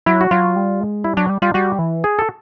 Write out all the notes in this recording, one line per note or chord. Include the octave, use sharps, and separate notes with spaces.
F#3 E4
F#4
F#3 F4
G3
G#3
G3 E4
F#3 D4
G3
G3 F4
G3 F#4
E3
G#4
A4